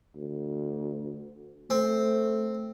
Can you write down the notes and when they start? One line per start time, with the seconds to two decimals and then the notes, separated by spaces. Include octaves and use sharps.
0.15 D2
1.70 A3 C4